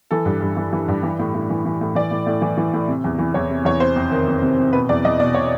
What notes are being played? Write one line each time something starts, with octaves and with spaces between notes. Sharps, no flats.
E3 A4
G2
G2
E3
E3
G2
E3
A2
A2
E3
E3
A2
E3 D5
A2
A2
E3
E3
A2
C3
E2
E3
E2 C#5
C3
E2 C#5
C3 C5
F2
D#3
F2
C3
F2
B2 B4
E2 D5
E2 D#5
B2 D5
B2 C#5